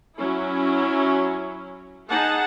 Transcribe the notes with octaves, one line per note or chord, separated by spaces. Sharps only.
F#3 C#4 E4
D#4 G#4 F#5 A5